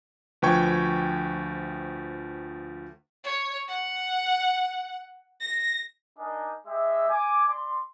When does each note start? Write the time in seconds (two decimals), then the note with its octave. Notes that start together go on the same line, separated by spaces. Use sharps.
0.42 D2 F3 B4 G5 C#6 G#6
3.24 C#5
3.68 F#5
5.41 A#6
6.18 D4 D#4 A#4 D#5 G#5
6.67 G#3 G4 E5
7.10 G#5 D6
7.49 D5 B5 C6